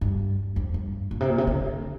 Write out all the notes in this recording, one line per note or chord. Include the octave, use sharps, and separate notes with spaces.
G2
F2
G2
A#2
C3
A#2
C3
D3